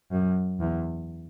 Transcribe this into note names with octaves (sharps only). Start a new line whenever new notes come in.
F#2
E2